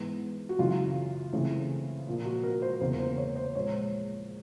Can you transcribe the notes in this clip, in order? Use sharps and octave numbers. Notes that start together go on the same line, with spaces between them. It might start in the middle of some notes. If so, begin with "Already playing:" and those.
Already playing: G#2 E3 G#3 B3
F#4
F#2 C#3 E3 F4
C#3 E3 A3 C4
A#2 F3 A#3
F#4
A#4
C5
E2 C#3 F#3 A#3 C5
C5
C#5
C5
A#2 F3 G#3 C#5